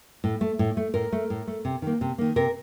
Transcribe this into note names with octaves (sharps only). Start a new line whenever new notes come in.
A2
A3
A2
A3
A2 A#4
A3
A2
A3
C3
D#3 A#3
C3
D#3 A#3
C3 A#4